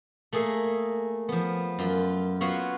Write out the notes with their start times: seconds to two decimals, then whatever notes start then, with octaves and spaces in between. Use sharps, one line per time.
0.33 A3 A#3 G#4 A4
1.29 F3 B3
1.79 F#2 F4
2.41 B3 F4 F#4 B4 C#5 F5